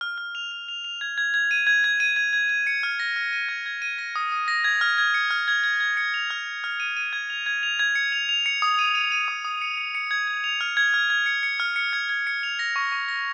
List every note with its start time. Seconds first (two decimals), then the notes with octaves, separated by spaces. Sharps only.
0.01 F6
0.18 F6
0.35 F7
0.51 F7
0.68 F7
0.84 F7
1.01 G#6
1.18 G#6
1.34 G#6
1.51 D#7
1.67 G#6
1.84 G#6
2.00 D#7
2.16 G#6
2.33 G#6
2.49 G#6
2.67 C#7
2.83 F6
3.00 A#6
3.16 F6
3.33 D#7
3.49 G#6
3.66 G#6
3.82 D#7
3.98 A#6
4.16 D#6
4.32 D#6
4.48 A#6
4.64 G#6
4.81 F6
4.98 G#6
5.14 C#7
5.31 F6
5.48 G#6
5.64 G#6
5.80 G#6
5.97 C#7
6.14 F7
6.30 F6
6.47 F6
6.64 F6
6.80 D#7
6.97 D#7
7.13 G#6
7.30 F7
7.46 G#6
7.63 F7
7.79 G#6
7.95 C#7
8.12 F7
8.29 F7
8.46 C#7
8.62 D#6
8.79 D#7
8.95 D#7
9.12 D#7
9.28 D#6
9.45 D#6
9.62 C#7
9.78 C#7
9.95 C#7
10.11 G#6
10.27 G#6
10.44 F7
10.61 F6
10.77 G#6
10.94 F6
11.10 G#6
11.26 C#7
11.43 C#7
11.60 F6
11.76 C#7
11.93 G#6
12.09 G#6
12.27 C#7
12.43 F7
12.59 A#6
12.76 C#6
12.92 C#6
13.08 A#6